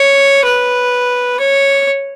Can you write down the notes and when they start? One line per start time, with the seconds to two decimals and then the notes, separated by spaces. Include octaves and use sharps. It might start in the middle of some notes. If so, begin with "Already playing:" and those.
Already playing: C#5
0.45 B4
1.39 C#5